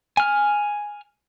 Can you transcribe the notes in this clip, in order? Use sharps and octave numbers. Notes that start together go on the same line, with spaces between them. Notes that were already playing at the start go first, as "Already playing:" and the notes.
G#5 F6